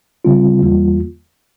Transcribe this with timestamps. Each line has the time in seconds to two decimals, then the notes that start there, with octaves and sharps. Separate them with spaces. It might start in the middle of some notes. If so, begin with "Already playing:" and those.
0.25 C#3 G3 C4 F4
0.62 E2 E3 G3 A#3 F4